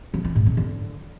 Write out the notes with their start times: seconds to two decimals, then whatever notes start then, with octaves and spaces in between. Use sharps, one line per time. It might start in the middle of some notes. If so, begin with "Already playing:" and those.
0.14 F#3
0.25 E3
0.35 G#2
0.46 C3
0.57 D3